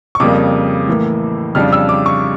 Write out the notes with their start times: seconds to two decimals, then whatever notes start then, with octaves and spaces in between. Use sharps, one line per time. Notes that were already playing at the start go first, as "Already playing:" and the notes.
0.15 C#6
0.20 F2 C#3 G3 A#3 D6
0.88 A2 E3 A#3
1.55 F2 C#3 G3 D4 F6
1.72 E6
1.89 D6
2.06 C#6